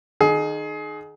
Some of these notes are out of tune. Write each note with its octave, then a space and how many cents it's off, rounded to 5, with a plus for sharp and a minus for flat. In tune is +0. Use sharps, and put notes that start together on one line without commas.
D#3 -25 G#4 +25